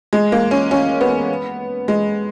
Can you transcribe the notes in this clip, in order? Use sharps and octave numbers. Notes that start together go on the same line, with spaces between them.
G#3
A#3
C#4
C#4
B3
G#3